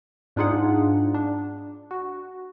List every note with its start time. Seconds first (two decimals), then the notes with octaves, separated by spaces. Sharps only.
0.36 G#2 D4 D#4 F4 G#4 F#5
1.14 D4
1.91 F#4